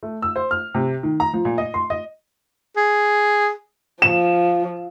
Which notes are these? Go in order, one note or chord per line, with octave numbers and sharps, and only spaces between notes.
A3
E6
C5
F6
C3
D#3
A#5
F3
A#2
D#5
C6
D#5
G#4
F3 E7